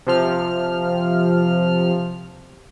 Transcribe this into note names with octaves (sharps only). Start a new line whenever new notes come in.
C3 F3 F6